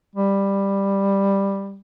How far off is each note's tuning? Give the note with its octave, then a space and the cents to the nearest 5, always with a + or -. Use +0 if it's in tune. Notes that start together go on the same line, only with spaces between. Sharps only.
G3 +10